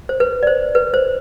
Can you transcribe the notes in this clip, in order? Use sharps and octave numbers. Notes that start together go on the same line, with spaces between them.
C5
B4
D5
C5
B4
C5